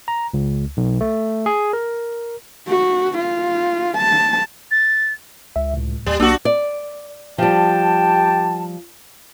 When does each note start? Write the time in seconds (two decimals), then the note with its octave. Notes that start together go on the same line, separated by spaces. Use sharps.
0.08 A#5
0.34 C#2
0.77 B1
1.01 A3
1.46 G#4
1.73 A#4
2.68 F#4
3.18 F4
3.97 A5
4.71 A6
5.56 C#2 E5
5.74 C2 A2
6.06 D#2 G3
6.20 B1 A#3 D4 F#4 E6
6.45 D5
7.38 F3 G3 G4 G5 A5